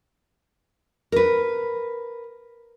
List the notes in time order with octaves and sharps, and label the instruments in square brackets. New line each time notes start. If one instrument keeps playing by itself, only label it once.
[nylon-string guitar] A#4 B4